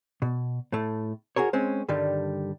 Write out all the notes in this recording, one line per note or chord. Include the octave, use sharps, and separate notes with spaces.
B2
A2 A3
F#4 G#4 A#4 C#5
G#3 C4 C#4
G2 D3 D#3 G3